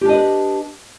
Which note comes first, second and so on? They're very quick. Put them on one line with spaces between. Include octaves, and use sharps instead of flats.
G4 D4 D#5 B4